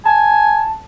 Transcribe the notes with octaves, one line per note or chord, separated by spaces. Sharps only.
G#5 A5